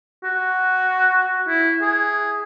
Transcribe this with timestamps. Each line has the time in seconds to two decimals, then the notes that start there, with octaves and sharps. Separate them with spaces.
0.24 F#4
1.48 E4
1.82 G#4